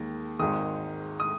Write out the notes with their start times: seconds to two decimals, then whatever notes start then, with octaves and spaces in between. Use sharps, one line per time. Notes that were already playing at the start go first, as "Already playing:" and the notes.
Already playing: D#2 D#3 G#3
0.39 G#1 G#2 D#3 G#3 D#6
1.20 D#6